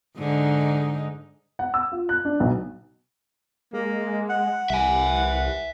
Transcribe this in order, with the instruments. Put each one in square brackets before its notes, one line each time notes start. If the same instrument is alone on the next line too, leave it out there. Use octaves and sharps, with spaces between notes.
[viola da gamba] G#2 D3 D#4
[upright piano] F#5
E6
F4
F#6
D4
B1
[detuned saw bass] G#3 [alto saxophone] A#3
[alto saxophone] F#5
[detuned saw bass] C2 [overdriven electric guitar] E5 G#5